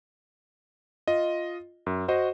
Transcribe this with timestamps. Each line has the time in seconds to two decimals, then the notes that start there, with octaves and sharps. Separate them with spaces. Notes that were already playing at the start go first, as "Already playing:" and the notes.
1.08 F4 D#5
1.86 F#2
2.08 F#4 C5 D#5